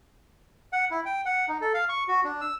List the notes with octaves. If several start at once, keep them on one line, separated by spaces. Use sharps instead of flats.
F#5
E4
G5
F#5
D#4
A4
F5
C#6
F#4
D4
E6